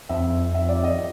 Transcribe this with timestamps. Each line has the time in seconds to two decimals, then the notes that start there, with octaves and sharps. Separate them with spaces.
0.09 F2 E5
0.54 E5
0.69 D5
0.83 D#5